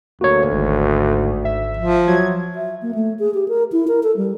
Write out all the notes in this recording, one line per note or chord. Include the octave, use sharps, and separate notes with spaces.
D2 A#3 F#4 C#5
G#1 G#2
E5
F3
F#3 G#6
E5
A#3
A3
G#4
G4
A#4
E4
A#4
A4
G3